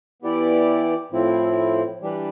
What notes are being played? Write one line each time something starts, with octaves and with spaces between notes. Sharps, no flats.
E3 B3 E4 G4 D5
A2 F3 C4 E4
E3 G3 D4 G4 B4